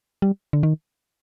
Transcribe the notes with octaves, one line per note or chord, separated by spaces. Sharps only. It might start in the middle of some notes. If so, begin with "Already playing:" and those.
G3
D3
D#3